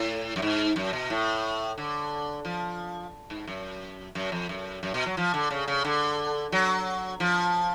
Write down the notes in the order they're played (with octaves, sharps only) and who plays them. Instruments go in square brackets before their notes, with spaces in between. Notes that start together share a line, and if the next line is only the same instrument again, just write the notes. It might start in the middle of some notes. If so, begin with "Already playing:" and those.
Already playing: [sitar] A2
F#2
G#2
F#2
B2
A2
D3
F3
G#2
F#2
F#2
F2
F#2
F#2
B2
F#3
F3
D3
C#3
C#3
D3
F#3
F3